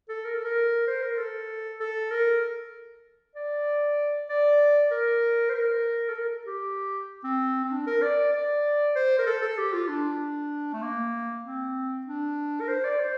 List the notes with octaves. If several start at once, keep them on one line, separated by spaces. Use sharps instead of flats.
A4
A#4
A4
A#4
C5
A#4
A4
A4
A#4
D5
D5
A#4
C5
A#4
A4
A#4
G4
C4
C4
D4
A#4
D5
D5
C5
A#4
A4
A4
G4
F4
D4
A3
A#3
C4
D4
A#4
C5
D5
C5